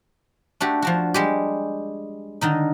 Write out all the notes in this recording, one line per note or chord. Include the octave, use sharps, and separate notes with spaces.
A3 D4 F#4 G4
F3 D4 F#4
G3 G#3 G4
D3 D#3 D#4